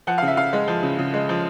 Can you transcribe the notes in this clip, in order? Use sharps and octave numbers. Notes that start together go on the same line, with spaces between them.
F3 F#5
C#3 F5
E5
C#3 F5
G#3
F3
C#3
C#3
G#3
F3